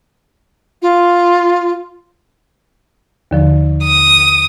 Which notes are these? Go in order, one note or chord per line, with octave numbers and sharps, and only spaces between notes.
F4
D#2 D3 F3
D#6